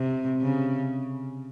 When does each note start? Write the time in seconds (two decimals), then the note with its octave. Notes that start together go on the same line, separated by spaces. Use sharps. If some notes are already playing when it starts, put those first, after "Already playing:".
Already playing: C3
0.42 C#3